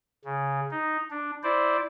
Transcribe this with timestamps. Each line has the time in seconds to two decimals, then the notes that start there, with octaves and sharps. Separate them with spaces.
0.25 C#3
0.71 D#4
1.10 D4
1.43 E4 C5 D5